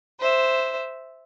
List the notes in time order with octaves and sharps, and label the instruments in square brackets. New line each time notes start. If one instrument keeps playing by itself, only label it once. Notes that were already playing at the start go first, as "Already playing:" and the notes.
[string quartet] C5 E5